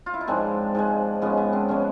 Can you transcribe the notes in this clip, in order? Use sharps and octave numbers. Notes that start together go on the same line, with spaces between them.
F4
E4
D#4
G#2 F3 G#3 C4 D4
G#2 F3 G#3
G#2 F3 G#3 B3 C#4
B3
C4 D4
F3 G#3 B3 C#4